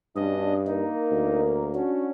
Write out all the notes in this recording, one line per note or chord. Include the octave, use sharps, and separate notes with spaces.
G2 B2 C#4 D4 D#5
A#3 D#4 A#4
D2
C#4 D4 F#4